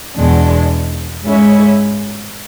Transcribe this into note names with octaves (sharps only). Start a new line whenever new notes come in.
E2 B2 G#3 D4
G#2 G#3 C#4 E4